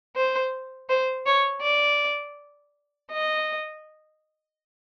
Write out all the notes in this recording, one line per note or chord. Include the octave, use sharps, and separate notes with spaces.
C5
C5
C#5
D5
D#5